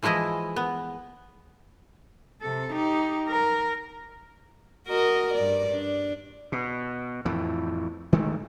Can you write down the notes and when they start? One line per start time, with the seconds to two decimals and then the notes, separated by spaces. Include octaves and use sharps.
0.03 E3 F3 G#3 E4 D#5
0.56 B3
2.42 C3 A4
2.72 D#4 G4
3.28 A#4
4.87 F#4 A#4 D#5
5.34 G2 D5
5.72 D4
6.52 B2
7.25 F2 A2 E3
8.13 D#3 G#3 A3